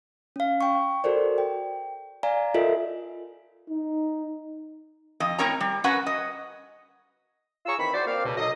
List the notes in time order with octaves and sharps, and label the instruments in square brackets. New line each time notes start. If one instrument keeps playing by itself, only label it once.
[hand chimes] C#4 F5
G5 C#6
F#4 A4 A#4 C5 D5
G5
D5 F5 G#5 A#5
F4 A4 A#4 D#5 E5
[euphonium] D#4
[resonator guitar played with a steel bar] F2 D#5
A2 C4 A#4 C#5 A#5
G3
C#4 F#4 A#4 B4 F#5
D#5
[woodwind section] F4 G#4 C#5 A#5 C#6 E6
D#3 E3 C4 B5
F#4 C5 D5
A#3 C4 D5 F5
C#2 B2
F#3 D#4 A4 D#5